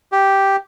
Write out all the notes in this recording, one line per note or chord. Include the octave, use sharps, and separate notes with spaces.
G4